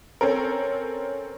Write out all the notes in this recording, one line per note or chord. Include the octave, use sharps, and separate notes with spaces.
C4 C#4 A4 A#4